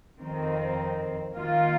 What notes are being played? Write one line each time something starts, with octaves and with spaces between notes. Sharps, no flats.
F2 D#3 C4
D#3 A#3 F4